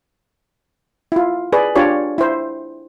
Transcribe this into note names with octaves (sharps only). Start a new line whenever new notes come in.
E4 F4
G#4 B4 D5
D4 F4 G4 C#5 D5
E4 C5